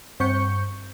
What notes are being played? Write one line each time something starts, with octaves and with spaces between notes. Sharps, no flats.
G2 C4 C#6 G6 C#7